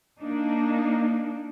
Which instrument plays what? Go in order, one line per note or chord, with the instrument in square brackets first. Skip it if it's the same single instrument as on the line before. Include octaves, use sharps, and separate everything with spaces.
[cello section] A#3 D4 D#4